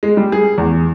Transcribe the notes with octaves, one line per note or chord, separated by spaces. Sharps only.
G#3
G3
G#4
E2